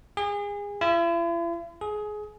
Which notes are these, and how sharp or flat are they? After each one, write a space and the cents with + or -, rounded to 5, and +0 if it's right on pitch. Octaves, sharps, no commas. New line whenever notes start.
G#4 -30
E4 +45
G#4 +20